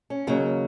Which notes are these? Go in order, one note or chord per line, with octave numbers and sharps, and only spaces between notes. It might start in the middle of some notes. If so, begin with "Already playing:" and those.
C#4
D#2 C#3 F#3 A#3